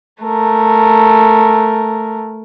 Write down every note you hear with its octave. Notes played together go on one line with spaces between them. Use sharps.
A3 A#4